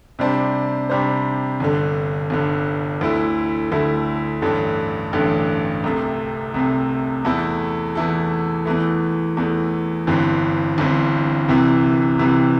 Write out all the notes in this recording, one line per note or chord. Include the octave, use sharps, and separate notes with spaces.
C3 G3 D4 C5
C3 G3 D4 C5
G1 G2 D3
G1 G2 D3
D2 D3 A3 E4
D2 D3 A3 E4
A1 G2 D3 A3
A1 G2 D3 A3
C2 C3 A3
C2 C3 A3
E2 E3 A3 E4 A4
E2 E3 A3 E4 A4
E2 E3 A3
E2 E3 A3
G1 G2 E3 C4
G1 G2 E3 C4
C2 C3 E3
C2 C3 E3